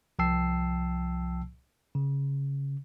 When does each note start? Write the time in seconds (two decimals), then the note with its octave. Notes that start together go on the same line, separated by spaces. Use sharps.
0.19 C2 F3 G5 A5 E6 C7
1.95 C#3